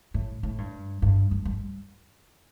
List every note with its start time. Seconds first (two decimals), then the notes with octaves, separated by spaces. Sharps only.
0.14 A2
0.43 A2
0.58 G2
1.02 G2
1.31 G2
1.45 G2